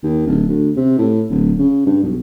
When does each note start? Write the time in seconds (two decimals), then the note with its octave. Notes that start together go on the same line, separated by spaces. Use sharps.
0.03 D#2
0.27 D1
0.48 D2
0.77 C3
0.99 A2
1.30 D1
1.59 C#3
1.86 G2
2.03 B1